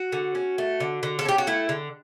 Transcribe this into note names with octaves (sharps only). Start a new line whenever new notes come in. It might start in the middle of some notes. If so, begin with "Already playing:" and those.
Already playing: F#4
D3
C#4
A3
D3
D3
A4
C#4 G4
F#4
A3 E4
D3